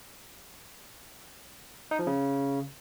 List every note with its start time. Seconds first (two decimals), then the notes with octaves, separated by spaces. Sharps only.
1.91 D#4
1.99 F3
2.07 C#3